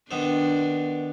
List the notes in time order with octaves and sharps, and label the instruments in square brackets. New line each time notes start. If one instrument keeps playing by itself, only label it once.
[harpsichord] D#3 B3 C5 [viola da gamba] D4